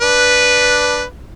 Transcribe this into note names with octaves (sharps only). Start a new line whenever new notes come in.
D4 B4